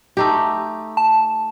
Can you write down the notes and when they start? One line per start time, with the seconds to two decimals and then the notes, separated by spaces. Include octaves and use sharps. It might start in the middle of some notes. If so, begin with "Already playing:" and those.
0.17 A3 D#4 G4
0.97 A5